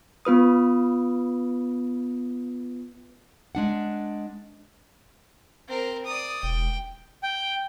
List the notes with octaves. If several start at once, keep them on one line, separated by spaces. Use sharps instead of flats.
B3 F4 B4 D#6
G#3 D4 F#5
C4 A#4
D5 D#6
E1 G5
G5